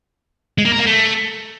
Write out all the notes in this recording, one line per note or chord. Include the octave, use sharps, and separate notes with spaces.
G#3
A#3
A#4
A#3
A3